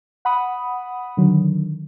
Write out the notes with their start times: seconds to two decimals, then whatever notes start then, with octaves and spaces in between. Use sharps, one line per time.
0.25 F#5 B5 D#6
1.17 D3 D#3 F#3